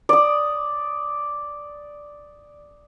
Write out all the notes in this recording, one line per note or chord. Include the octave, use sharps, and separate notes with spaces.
D5 D#6